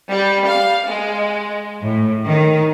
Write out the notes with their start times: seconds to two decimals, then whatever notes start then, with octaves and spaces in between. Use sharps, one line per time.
0.12 G3
0.47 F5
0.87 G#3
1.83 A2
2.26 D#3